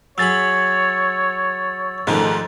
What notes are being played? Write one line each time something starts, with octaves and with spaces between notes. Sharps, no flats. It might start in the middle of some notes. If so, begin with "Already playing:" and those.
F#3 G#4 C#5 B5 E6 A6
G#2 D#3 F3 A3 D4 G4